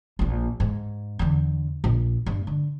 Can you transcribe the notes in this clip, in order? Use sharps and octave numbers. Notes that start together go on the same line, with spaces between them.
A#1 A#2
G#2
E2 D3
A#1
G2
D3